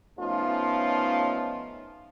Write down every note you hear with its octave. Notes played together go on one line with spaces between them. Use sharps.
F3 A3 B3 C#4 D#4 F4